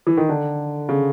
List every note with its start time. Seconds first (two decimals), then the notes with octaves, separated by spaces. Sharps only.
0.07 E3
0.17 D#3
0.29 D3
0.89 C#3